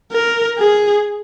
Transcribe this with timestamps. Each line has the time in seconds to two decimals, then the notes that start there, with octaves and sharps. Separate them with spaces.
0.12 A#4
0.58 G#4